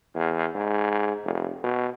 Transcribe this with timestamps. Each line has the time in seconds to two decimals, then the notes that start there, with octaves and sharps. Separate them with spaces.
0.15 E2
0.55 G#2
1.24 F1
1.64 B2